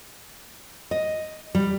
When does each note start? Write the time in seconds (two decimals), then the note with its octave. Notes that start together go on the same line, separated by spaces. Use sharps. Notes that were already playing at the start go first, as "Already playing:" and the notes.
0.91 D#5
1.55 G3